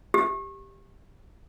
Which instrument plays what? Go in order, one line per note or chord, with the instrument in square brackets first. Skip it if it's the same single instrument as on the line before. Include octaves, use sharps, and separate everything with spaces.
[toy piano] G4